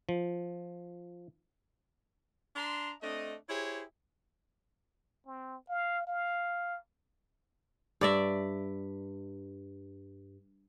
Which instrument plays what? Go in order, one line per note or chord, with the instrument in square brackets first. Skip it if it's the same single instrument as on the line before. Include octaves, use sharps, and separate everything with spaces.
[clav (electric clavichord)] F3
[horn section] D4 A5 A#5 C6
A3 C4 D4 D#5
E4 G4 G#4 C5 C#5
[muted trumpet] C4
F5
F5
[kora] G2 D5 E5